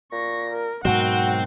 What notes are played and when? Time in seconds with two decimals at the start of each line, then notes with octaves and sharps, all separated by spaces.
0.12 A#2 C#6 A#6
0.51 A#4
0.85 G#2 B2 F#3 C4 F#4 A#4 F#5